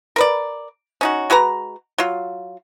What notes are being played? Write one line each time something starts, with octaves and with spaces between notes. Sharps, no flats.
A#4 B4 D5
C#4 D#4 F#4
G#3 F#4 B4 A#5
F#3 F4